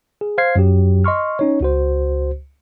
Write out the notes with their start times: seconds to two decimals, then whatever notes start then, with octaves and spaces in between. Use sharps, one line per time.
0.21 G#4
0.38 C5 F5 F6 G#6 C7
0.56 F#2 F#3 G4
1.04 D#5 C6 C#6 F6
1.39 C#4 D#4 C#5
1.61 C#2 F#4 C5